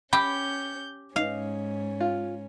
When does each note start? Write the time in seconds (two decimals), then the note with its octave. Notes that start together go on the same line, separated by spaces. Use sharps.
0.13 C#4 G4 B5 G6
1.16 G#2 C#4 D#4 F5
2.00 F4